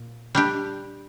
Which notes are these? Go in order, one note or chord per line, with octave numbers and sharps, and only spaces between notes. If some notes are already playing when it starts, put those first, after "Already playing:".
Already playing: A#2
G3 D4 G4